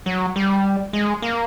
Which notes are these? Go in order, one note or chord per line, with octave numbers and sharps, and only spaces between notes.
F#3
G3
G#3
A#3